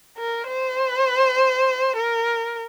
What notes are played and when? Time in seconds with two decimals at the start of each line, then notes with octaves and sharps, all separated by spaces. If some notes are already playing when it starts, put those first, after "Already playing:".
0.18 A#4
0.48 C5
1.96 A#4